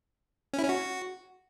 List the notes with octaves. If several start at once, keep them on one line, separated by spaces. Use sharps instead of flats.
C#4
E4
C#4
F#4